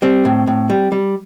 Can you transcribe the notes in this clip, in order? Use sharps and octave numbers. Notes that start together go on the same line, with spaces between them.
G3 C4
A2
A2
G3
G3